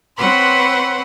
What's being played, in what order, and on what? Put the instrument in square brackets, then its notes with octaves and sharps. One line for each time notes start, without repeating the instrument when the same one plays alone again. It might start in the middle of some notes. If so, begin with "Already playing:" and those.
[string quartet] C4 B4 C#5 F#5 B5 C6